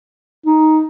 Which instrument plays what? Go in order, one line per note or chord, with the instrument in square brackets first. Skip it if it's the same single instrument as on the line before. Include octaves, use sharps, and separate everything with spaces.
[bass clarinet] D#4